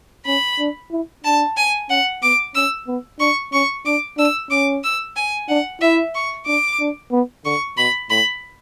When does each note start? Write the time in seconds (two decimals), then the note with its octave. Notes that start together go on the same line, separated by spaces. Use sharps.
0.26 C#4 B5
0.59 D4
0.91 E4
1.24 D4 A5
1.57 G#5
1.90 C#4 F#5
2.23 B3 D6
2.55 C#4 E6
2.88 B3
3.20 D4 C#6
3.52 C#4 C#6
3.85 D4 D6
4.18 D4 E6
4.50 C#4 D6
4.84 E6
5.16 G#5
5.48 D4 F#5
5.81 E4 E5
6.15 C#6
6.46 D4 D6
6.80 D4
7.12 B3
7.45 D3 C#6
7.77 B2 B5
8.10 A2 B5